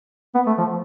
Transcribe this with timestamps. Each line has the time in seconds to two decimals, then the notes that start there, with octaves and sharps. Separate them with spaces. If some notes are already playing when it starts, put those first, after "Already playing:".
0.35 B3
0.47 A3
0.58 F3